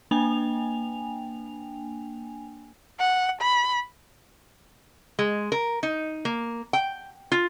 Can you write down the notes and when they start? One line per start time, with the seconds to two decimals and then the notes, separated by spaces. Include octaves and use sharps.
0.11 A#3 D4 G5 G#5 F7
3.00 F#5
3.42 B5
5.19 G#3
5.52 A#4
5.83 D#4
6.25 A#3
6.73 G5
7.32 F4